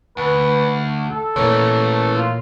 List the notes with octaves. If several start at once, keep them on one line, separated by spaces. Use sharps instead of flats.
D2 B4
A4
A#2 E3 A3 A#4 C#5
F4